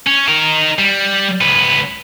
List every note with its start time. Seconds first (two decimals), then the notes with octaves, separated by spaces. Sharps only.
0.07 C#4
0.28 D#4 A#4
0.79 G3
1.41 C#2 B3